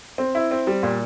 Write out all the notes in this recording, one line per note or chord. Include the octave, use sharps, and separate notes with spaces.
C4
E4
C4
G3
A#2